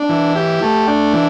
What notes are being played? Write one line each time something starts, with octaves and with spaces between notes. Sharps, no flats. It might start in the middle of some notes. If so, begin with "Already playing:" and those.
Already playing: D4
E3
G4
A3
D4
E3